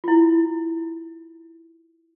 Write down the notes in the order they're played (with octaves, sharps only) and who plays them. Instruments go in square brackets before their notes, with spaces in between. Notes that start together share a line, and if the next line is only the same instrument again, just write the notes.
[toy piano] E4 F4